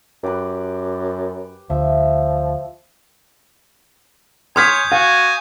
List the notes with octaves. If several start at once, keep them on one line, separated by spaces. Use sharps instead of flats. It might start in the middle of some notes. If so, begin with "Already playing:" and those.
F#2 G4 B4
D2 F3 E5
C#5 G#5 C6 D#6 F6 G6 G#6 B6
F#4 F5 G#5